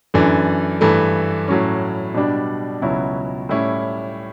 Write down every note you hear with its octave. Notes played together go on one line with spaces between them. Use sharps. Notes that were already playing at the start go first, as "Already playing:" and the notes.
F#2 E3 A3 D4
G2 E3 A3
A2 F#3 C#4
B2 G3 D4
C#2 B2 F#3 C#4 E4
A2 G3 C#4 E4